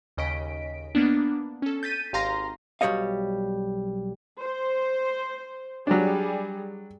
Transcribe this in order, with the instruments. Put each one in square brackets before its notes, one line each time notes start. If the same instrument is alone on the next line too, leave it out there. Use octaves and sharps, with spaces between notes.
[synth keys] D#2 C#3 D#5 B6 D7
A#3 B3 D4
C#4 A4
G6 A6 B6 D#7
G#1 G4 F5 A#5 C6 A#6
[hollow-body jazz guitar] B1 B2 G3 C#5 D#5 F5
[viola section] C5
[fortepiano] F#3 D4 [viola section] G3 G#4